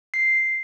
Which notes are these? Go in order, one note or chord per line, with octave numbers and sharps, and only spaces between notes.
C7